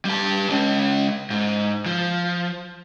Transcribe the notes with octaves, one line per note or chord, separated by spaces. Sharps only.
G3 A5
G#3 C#4
G#2
F3